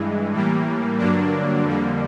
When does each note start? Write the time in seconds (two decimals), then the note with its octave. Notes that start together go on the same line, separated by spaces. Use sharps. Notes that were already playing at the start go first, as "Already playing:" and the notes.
Already playing: G2 E3 G#3
0.33 A2 E3 G3 A#3
0.98 G2 D3 F#3 A#3 D4
1.65 F2 D3 G3 A#3